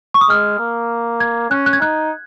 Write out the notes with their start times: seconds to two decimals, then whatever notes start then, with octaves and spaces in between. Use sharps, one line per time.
0.14 C#6
0.21 D#6
0.29 G#3 F6
0.60 A#3
1.20 G#6
1.50 C#4 F#6
1.66 F#6
1.73 G#6
1.80 D#4 F#6